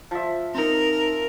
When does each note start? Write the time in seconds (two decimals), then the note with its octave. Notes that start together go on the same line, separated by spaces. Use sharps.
0.11 F3 E5
0.55 C4 D#4 A#4